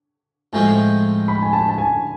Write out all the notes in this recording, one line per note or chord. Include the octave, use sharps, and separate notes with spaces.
A2 F3 G#3 C4 G#5
B5
G#5
A5
A5
G#5